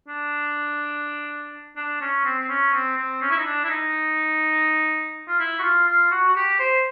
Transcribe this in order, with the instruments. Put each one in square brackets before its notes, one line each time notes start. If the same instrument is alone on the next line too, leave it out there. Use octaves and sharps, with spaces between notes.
[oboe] D4
D4
C#4
C4
C4
C#4
C4
C4
C#4
E4
D#4
D4
E4
D#4
F4
E4
F#4
F4
F4
F#4
F#4
G4
C5